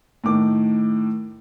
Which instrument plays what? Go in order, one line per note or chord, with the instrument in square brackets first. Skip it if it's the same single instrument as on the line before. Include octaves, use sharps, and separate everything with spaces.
[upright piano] A2 D#3 D6